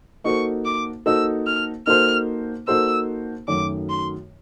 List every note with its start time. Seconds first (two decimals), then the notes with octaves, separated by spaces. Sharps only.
0.24 A#3 D#4 F#4 A4 C5 C#6
0.65 D6
1.06 A#3 D#4 F#4 A4 C5 E6
1.46 F6
1.87 A#3 D#4 F#4 A4 C5 F6
2.67 A#3 D#4 F#4 A4 C5 E6
3.48 F#2 D#3 F#3 A3 D6
3.89 C6